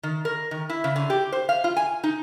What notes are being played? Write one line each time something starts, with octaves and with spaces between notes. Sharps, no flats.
D#3
A#4
D#3
E4
C#3
D3
G4
C5
F5
F4
G#5
D#4